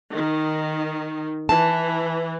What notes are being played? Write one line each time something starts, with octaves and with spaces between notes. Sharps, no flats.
D#3
E3 A5